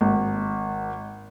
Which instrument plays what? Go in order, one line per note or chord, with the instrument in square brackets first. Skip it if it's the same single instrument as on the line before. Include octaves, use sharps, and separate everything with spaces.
[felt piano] G#1